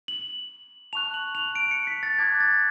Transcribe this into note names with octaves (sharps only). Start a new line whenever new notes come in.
F#7
A5 C#6 F#6 F7
F#7
F7
D7
C#7
B6
A6
A5 D6 F#6 G#6
A6